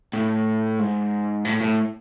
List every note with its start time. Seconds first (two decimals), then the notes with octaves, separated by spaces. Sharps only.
0.13 A2
0.79 G#2
1.45 A2
1.61 A2